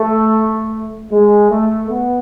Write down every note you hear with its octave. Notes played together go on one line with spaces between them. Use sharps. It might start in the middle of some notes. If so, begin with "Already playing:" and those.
Already playing: A3
G#3
A3
B3